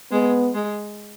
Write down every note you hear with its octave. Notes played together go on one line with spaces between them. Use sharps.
G#3 B3
G#3